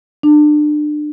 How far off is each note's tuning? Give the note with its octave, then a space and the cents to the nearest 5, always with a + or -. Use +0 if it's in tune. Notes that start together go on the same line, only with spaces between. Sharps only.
D4 +30